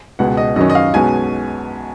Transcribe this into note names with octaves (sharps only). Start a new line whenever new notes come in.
C#2 B2 G#3 F#5
D#5
F#2 D#3 F#3 C#4 D#5
D#5
F5
B1 B2 G#3 C#4 G#5